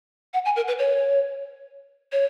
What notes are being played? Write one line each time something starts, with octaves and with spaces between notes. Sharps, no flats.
F#5
G#5
A#4
B4
C#5
C#5